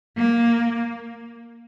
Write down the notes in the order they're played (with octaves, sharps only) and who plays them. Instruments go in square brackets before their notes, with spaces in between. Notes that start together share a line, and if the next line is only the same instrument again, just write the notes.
[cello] A#3